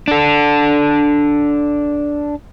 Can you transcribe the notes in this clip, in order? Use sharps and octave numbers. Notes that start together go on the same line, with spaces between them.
D4 A4